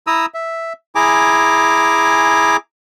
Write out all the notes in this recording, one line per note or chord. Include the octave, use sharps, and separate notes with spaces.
E4 A#5 D#6 E6
E5
E4 G#4 G#5 A#5 D6